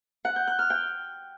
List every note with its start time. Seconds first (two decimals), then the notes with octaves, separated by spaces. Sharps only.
0.25 F#5
0.36 G6
0.47 F#6
0.59 F6
0.70 G5